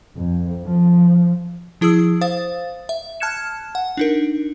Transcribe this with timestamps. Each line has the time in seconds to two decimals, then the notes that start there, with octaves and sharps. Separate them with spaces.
0.17 F2
0.65 F3
1.81 F3 E4 G#4 D#6 E6
2.21 C5 F5 D#6 A6
2.89 E5
3.20 A5 F6 F#6 G#6 C#7 E7
3.75 F#5
3.97 D4 D#4 A#4